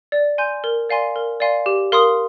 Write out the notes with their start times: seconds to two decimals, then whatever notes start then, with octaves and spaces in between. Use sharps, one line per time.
0.12 D5
0.38 G#5 C6 G6
0.64 A#4
0.89 D5 F5 G#5 C6
1.16 A#4
1.40 D5 F5 G#5 C6
1.66 G4
1.92 A#4 F5 C6 D#6